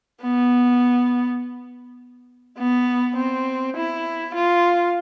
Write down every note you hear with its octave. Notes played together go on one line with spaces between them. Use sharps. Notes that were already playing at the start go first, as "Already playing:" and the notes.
B3
B3
C4
E4
F4